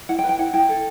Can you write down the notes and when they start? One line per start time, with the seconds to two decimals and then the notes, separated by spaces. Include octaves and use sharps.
0.09 E4 F#5
0.19 G5
0.24 B4
0.29 G5
0.39 E4 F#5
0.53 E4 G5
0.69 A4